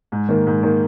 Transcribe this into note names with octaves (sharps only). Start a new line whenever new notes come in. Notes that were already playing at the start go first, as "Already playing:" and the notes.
G#2
D#3 A#3
G#2
D#3 A#3